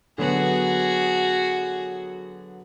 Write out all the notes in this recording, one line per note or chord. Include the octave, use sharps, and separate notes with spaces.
D3 F#3 B3 F#4 G#4